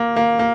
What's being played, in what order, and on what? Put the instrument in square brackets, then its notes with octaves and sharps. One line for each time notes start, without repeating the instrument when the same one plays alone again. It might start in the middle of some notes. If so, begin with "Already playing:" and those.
Already playing: [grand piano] A#3
A#3
A#3